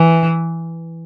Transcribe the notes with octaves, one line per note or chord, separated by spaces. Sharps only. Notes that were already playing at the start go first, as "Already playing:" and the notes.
Already playing: E3